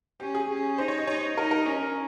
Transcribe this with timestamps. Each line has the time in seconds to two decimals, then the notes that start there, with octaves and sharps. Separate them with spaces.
0.20 C#4 G4
0.35 G#4
0.50 C#4
0.78 D#4 C5
0.88 C#5
0.98 D#5
1.07 D#4 C#5
1.37 D#4 A#4
1.51 A#4
1.66 C#4